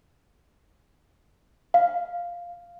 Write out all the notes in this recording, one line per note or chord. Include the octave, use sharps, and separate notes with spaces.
F5